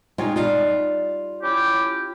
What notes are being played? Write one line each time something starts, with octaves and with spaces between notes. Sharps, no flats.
G#3 D#4 F4 C#5 G5
G3 D#4 F4
C#4 E4 G4